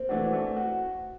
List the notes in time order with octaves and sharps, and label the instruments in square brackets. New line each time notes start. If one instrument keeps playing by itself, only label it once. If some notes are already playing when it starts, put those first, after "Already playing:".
Already playing: [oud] A#3 C4
[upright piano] E3 A3 D4 F#4
A3
F#4